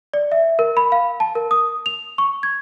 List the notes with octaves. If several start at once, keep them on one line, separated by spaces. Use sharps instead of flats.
D5
E5
A#4
B5
F5
A5
A#4
D#6
F7
C#6
G#6